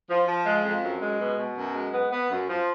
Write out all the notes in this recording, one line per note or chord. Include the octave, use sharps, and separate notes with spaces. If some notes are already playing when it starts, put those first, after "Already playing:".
F3
F3
G#3
F2
F#2
G#3
B2
B2
F#2
G#3
B3
B3
F#2
F3